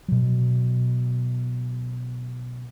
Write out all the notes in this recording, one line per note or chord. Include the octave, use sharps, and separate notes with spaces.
B2 F#3